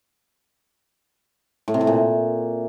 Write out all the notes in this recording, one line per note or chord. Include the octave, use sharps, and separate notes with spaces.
A2
C3
A2
A#2